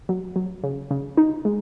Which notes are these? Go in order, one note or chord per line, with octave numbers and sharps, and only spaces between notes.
F#3
F#3
C#3
C#3
D#4
G#3